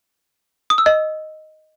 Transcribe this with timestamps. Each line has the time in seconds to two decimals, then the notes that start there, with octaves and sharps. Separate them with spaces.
0.70 D#6
0.78 E6
0.86 D#5